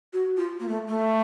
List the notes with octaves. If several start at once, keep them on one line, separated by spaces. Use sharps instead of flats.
F#4
F4
A#3
A3
A3